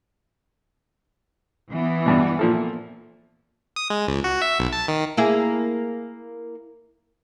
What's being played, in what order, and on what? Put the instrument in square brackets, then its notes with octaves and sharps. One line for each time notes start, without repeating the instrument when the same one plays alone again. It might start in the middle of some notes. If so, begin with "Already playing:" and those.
[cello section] E3 B3
[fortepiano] G2 B2
A#2 F3 A4
[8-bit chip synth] D#6
G#3
C#2
F#4
E5
B1
A5
D#3
[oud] A#3 E4 G#4